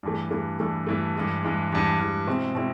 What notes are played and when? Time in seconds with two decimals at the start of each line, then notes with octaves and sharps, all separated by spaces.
0.03 G2 E3 A3
0.31 G2 E3 A3
0.60 G2 E3 A3
0.87 G2 E3 A3
1.15 G2 E3 G#3
1.43 G2 E3 G#3
1.72 G2 E3 G#3
1.99 G2 E3 G#3
2.27 B2 G#3 C4 E4
2.55 B2 G#3 C4 E4